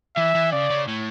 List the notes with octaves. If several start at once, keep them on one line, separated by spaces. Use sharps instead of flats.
E3 E5
E3
C#3 D5
C#3
A2